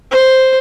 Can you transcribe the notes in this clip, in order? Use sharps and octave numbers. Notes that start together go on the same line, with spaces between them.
C5